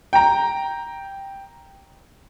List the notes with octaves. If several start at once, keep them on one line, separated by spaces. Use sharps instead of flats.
G5 A#5